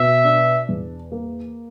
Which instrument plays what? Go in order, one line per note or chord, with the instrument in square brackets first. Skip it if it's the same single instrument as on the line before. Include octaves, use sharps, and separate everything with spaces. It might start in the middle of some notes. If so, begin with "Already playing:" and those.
Already playing: [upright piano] B2 [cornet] E5
[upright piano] D4
E2
A#3